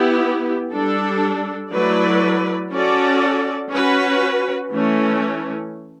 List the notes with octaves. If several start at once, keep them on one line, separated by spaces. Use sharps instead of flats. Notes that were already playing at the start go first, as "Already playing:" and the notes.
Already playing: B3 E4 G4
G3 D4 A4
F#3 A3 E4 B4 D5
C#4 F#4 A4 D5
C#4 F#4 B4
E3 A3 C#4